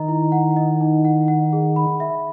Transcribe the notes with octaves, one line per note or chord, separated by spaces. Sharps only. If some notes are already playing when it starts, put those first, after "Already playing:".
Already playing: D#3 D#5 A#5
E4
F#5
D#5
D#4
F#5
F#5
G#4
B5
E5